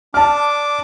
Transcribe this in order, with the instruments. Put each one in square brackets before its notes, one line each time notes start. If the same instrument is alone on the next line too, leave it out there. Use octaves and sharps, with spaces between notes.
[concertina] D4 D6 [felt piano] A5 F6